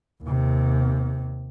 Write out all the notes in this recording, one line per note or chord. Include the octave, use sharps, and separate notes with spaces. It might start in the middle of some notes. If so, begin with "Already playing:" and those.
D#2 C3